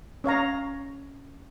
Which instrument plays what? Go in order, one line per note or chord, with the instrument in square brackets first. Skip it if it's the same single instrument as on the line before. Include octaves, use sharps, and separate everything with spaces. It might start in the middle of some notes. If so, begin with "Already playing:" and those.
[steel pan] C#4 C#5 F5 A#5